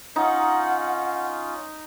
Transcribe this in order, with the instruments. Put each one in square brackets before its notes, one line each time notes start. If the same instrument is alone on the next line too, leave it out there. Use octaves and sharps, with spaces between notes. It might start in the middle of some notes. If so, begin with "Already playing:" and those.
[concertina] C#4 F4 [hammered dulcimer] D#4 [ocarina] F#5